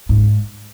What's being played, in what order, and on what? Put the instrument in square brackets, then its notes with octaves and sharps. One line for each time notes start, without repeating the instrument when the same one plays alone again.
[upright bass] G#2